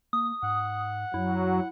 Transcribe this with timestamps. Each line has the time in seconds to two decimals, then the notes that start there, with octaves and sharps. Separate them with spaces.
0.13 A#3 D#6
0.43 G#2 F#5
1.14 F#2 F#3 E4